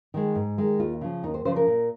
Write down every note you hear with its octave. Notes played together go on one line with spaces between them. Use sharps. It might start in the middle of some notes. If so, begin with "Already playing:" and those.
D#3 G#3
G#2
D#3 G#3
D#2 F4
C#3 F3
D#2 D#4
C5
C#3 F3 C5
A#4
A#2